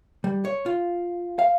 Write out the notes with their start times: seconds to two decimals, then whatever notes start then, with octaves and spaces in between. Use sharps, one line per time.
0.24 G3
0.45 C#5
0.66 F4
1.39 F5